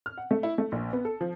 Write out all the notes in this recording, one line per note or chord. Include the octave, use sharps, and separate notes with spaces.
F6
F#5
A3
E4
A3
A#1
B3
A4
F3